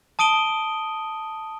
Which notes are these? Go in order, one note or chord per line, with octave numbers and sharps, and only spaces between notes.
A5 D#6 D7 D#7 G7